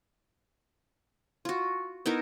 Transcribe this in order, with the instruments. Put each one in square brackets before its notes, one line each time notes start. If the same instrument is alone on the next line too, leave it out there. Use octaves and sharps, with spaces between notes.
[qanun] F4 F#4
B3 D#4 E4 A#4